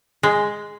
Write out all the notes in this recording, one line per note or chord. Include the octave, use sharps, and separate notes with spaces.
G#3